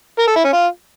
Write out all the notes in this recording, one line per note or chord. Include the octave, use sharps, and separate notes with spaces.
A#4
A4
E4
C#4
F4